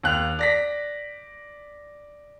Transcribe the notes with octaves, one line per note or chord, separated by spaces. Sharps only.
D#2 F#6 F7
D5 A#6 B6